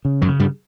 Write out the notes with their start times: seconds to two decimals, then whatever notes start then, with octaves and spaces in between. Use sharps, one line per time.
0.05 C#3
0.22 F#2 F#3
0.28 C#3
0.40 G2 G3